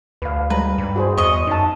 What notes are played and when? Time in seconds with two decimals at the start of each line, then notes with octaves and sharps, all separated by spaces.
0.22 D2 B4 F5
0.50 G3 G#3 B4 A#5
0.78 G2
0.96 F#4 G#4 C5
1.18 E2 D#5 C#6
1.47 F#2 D#4 A5